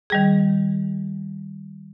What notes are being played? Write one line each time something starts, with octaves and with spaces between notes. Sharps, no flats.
D#3 G3 G#4